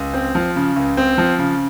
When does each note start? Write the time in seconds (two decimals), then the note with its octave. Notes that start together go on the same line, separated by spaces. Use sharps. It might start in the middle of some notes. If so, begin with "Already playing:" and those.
Already playing: C#2
0.14 C4
0.35 F3
0.56 C#3
0.76 C#2
0.97 C4
1.18 F3
1.39 C#3